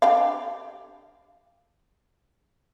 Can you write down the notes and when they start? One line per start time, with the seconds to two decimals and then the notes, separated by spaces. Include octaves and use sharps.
0.02 D4 G4 F5